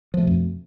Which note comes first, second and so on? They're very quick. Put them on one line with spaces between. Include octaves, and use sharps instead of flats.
F3 A3 B2 F2